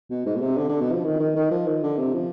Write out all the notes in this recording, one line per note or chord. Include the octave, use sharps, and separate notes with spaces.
B2
G#2
B2
C3
D3
D3
B2
F3
D#3
D#3
D#3
F3
D#3
D3
C3
F3